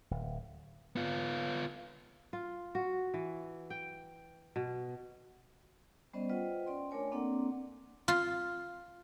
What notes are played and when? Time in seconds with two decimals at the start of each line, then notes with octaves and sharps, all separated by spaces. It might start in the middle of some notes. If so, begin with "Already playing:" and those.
0.11 D1
0.96 B3 F4
2.33 F4
2.75 F#4
3.14 E3
3.70 G5
4.56 B2
6.14 G3 B3 C#4 C5 D5 D#5
6.29 F4 B4 C5 D#5 F#5 G5
6.66 C#4 D5 G5 C6
6.91 A3 D4 A#4 C#5 G#5
7.12 A#3 C4 D4 A4 D5 F#5
8.08 F4